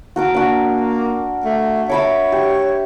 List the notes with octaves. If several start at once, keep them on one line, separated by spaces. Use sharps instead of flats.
F#4 A#4 D6
A#3 D4 F#4
A3
C#5 E5 B5 D6
G4